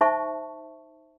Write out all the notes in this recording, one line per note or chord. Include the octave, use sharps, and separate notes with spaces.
D#4 C5 E5 A5 C#6